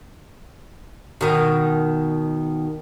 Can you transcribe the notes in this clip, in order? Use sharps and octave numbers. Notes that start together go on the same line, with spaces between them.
B2 D#3